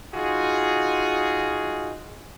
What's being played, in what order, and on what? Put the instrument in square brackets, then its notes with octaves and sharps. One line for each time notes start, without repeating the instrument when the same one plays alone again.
[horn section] D#4 F4 F#4 G#4